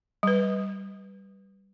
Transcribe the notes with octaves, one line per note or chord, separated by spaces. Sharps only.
G3 B4